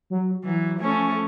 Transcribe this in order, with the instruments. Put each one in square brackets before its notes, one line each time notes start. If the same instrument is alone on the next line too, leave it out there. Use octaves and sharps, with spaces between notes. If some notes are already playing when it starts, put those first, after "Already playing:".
[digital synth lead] F#3
[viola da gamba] E3 [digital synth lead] F#3
[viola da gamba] F3 A3 C#4 [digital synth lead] G#5